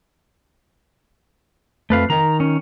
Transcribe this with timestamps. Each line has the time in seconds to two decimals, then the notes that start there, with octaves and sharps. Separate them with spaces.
1.90 F2 A3 B4 F5
2.10 D#3 A#5
2.40 C#4